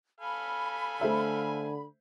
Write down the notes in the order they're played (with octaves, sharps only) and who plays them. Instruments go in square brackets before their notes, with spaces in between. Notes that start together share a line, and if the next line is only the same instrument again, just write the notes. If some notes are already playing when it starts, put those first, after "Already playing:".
[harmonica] A4 F5 G#5 [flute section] B5
[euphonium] D3 [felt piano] A3 C5 E5